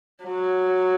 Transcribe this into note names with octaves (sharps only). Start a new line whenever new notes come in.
F#3